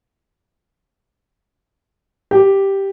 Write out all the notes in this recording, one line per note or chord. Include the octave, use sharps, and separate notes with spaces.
G4